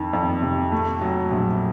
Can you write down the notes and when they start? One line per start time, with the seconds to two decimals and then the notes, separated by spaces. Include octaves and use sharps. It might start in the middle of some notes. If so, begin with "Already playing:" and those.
Already playing: F2 D#3
0.13 F2
0.42 C3
0.72 A3
1.01 F#3
1.31 A#1